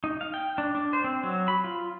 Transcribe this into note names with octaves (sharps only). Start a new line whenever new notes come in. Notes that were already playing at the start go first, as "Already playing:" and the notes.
D#4
F5
G5
D4
D4
C5
C4
F#3
B5
F4